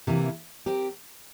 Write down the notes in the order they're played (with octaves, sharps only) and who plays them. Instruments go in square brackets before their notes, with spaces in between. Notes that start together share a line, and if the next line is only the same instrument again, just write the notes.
[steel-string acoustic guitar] C3 E3 A#3 E4 A#4
C4 G4 A#4